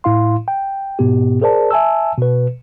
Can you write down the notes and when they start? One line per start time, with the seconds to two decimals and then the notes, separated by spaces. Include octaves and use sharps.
0.04 A2 E4 F5 C6
0.48 G5
0.99 G#2 B2 B3 G4
1.42 G#4 A#4 C5 D5 A5
1.71 E5 G#5 A5 E6
2.18 B2 B4